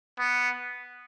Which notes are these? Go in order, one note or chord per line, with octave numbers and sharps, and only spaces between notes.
B3